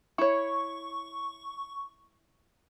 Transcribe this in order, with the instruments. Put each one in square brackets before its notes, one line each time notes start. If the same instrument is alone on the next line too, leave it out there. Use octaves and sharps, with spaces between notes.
[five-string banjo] E4 C#5 [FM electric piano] C#6